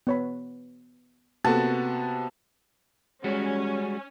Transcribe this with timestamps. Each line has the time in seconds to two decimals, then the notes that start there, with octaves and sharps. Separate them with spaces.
0.07 B3 C#5 B5
1.44 C3 A#3 B3 F#4 A4 A5
3.24 G3 G#3 C#4 F#4